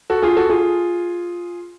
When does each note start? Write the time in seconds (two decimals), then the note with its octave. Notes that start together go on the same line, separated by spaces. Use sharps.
0.10 F#4 A4
0.22 F4 G#4
0.37 F#4 A4
0.49 F4 G#4